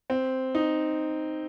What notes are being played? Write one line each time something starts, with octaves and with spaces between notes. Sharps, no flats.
C4
D#4